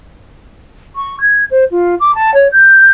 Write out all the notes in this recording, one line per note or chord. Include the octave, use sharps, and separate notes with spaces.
C#6
G#6
C5
F4
D6
A5
C#5
G6